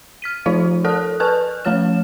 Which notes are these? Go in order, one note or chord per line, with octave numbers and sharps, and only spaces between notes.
F6 B6 D#7
F3 D#4 F4 C5 F5
A4 A#4 D5 A5 D#6 F#6
B4 G#5 A5 C#6 F6 F#6
F3 A3 C#4 C#5 F6 E7